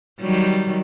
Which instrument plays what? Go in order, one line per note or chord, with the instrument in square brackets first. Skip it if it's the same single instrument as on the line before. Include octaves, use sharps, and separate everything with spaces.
[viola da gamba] D#3 F#3 G3